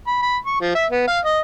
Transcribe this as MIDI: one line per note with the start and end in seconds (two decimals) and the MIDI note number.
0.07 0.19 83
0.22 0.37 83
0.45 0.59 85
0.60 0.72 53
0.75 0.86 76
0.90 1.06 59
1.08 1.18 77
1.25 1.40 75